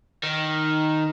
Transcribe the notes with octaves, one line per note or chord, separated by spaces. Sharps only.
D#3